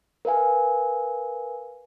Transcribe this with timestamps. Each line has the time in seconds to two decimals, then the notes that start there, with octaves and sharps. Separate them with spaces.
0.25 A#4 B4 F5 G#5